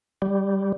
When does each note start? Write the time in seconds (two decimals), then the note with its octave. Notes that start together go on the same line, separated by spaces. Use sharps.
0.22 G3